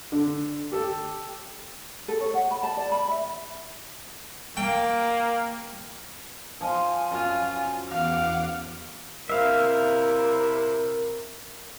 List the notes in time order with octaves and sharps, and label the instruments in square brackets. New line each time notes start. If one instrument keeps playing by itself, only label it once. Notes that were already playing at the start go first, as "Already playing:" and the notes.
[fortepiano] D3
G4 A4
[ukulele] A4
C#5
F#5
B5
A5
D5
B5
E5
[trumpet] A#3 [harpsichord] G5
[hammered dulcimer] F3 F4 [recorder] G#5
[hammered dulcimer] F#2 [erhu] F4
[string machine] E2 F#5 D6 [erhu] F5
[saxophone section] C3 E4 [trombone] A#4 [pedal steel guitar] E5 F5